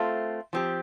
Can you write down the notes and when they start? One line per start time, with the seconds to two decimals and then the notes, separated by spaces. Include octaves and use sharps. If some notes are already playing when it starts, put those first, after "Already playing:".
Already playing: A3 C4 F4
0.53 F3 C4 G4